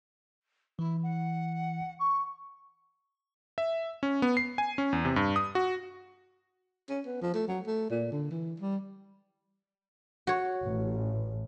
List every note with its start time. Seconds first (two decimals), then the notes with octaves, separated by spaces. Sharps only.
0.79 E3 E4
1.03 F#5
1.99 C#6
3.58 E5
4.03 C#4
4.22 B3
4.37 C7
4.58 G#5
4.78 C#4
4.93 E2
5.05 C3
5.16 G2
5.36 D#6
5.55 F#4
6.89 C#4
7.06 B3
7.22 F3
7.34 A3
7.48 F#3
7.67 A3
7.90 A#2
8.12 D3
8.31 E3
8.60 G3
10.27 F#4 C#5
10.64 A1